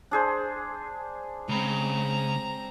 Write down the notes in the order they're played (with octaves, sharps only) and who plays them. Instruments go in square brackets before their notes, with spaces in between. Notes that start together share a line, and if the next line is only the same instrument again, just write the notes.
[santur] D4 G#4 C5
[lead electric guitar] C#3 B5 [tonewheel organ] G#3 [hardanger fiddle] C4 A#5